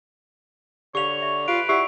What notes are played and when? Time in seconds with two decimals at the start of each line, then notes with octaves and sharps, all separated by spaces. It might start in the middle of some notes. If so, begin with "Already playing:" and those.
0.95 D3 G4 C#5 F5 C#6 F7
1.22 E5
1.48 F4 G4 B4 D7
1.69 E4 G4 D5 F#5